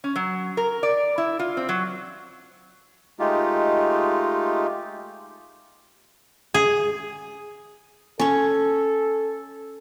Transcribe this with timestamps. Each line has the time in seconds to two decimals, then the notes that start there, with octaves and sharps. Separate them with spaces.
0.04 C#4
0.16 F#3
0.57 A#4
0.83 D5
1.18 E4
1.39 F4
1.57 C4
1.69 F#3
3.19 G#3 A3 D#4 F4 G4
6.54 G#4
8.20 C#4 A4 C#5